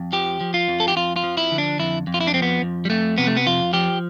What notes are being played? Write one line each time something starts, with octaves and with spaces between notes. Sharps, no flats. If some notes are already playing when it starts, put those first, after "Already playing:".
Already playing: F2
F3 G4
F3
F4
F2
A4
G4
F2 F4
F4
F3
E4
D3
D4
F2 E4
F2
F4
E4
D4
F3 C4
B3
F2
G3
F2 A3
C3 B3
A3
B3
F2 F4
F3 G4